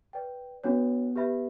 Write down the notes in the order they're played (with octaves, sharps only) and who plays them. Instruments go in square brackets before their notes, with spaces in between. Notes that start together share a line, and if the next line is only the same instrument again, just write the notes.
[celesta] B4 D5 G5
[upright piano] B3 [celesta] D4 F#4 C#5
[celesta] G4 B4 E5 B5